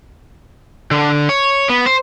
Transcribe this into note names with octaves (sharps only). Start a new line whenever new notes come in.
D3
C#5
B3
C5